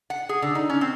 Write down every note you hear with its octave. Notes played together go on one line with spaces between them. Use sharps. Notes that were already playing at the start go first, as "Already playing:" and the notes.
F#5
G#4
D3
D#4
C#4
C4